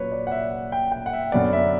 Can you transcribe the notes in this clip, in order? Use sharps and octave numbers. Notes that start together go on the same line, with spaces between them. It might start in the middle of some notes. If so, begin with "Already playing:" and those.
Already playing: A#2 F#3 C#4 B4 C#5
D5
F#5
E5
G5
G5
F#5
E5
F#2 D3 F#3 B3 D5
E5